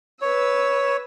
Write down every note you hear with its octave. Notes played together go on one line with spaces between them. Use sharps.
B4 C#5 E6